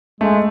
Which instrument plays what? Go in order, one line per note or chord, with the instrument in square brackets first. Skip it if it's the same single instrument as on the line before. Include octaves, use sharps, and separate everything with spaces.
[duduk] G#3 [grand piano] A3